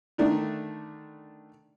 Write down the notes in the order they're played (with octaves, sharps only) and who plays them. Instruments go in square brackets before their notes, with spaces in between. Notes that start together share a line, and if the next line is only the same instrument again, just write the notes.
[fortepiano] D3 D#3 A3 D4